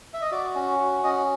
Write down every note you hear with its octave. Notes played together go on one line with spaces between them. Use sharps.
E5
D#5
F#4 D5
C#4
F#4
C#4 D#5